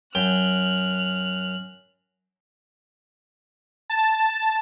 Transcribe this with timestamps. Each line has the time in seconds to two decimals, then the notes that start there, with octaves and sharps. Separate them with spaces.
0.15 F#2 G5 F6 F#6
3.90 A5